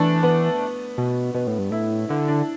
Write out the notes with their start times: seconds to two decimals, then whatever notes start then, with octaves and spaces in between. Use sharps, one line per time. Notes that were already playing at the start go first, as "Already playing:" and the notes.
Already playing: E3 A3 B3 D4
0.23 B3
0.98 B2
1.34 B2 B3
1.47 A2
1.59 G2
1.70 A2 E4
2.09 D3 E4
2.28 D4